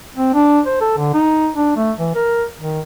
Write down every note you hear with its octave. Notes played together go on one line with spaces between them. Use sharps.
C4
D4
C5
A4
D3
D#4
D4
A3
E3
A#4
D#3